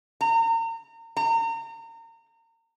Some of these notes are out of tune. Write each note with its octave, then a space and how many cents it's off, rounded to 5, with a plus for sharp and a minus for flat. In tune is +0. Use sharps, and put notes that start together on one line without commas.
A#5 -35
A#5 -35